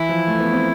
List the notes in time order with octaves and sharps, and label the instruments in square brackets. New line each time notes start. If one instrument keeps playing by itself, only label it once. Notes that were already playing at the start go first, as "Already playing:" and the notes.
Already playing: [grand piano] E3 [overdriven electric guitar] E4
[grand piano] F3
A3
B3
C4